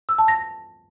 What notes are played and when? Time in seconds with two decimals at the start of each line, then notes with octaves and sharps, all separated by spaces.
0.09 E6
0.18 A5
0.28 A#6